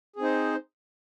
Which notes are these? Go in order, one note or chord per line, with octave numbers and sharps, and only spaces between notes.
C4 D#4 G#4 C5